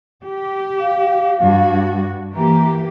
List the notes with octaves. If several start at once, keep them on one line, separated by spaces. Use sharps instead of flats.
G4
F5
G2 F#4
E3 A#3 G4 A#5